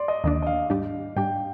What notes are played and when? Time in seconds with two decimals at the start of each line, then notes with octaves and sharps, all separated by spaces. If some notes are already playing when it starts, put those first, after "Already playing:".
Already playing: D5 C6
0.08 D#5
0.24 D#2 D#3 A#3 D4 D#5
0.42 D#5
0.47 F5
0.70 G#2 G3 D4 G4
1.16 G#2 G3 D4 G4 G5